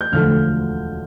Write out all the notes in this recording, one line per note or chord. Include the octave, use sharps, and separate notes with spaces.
G6
E1 D2 D3 F3 A3 F6